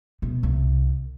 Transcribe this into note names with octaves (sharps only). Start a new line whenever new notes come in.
B2
C2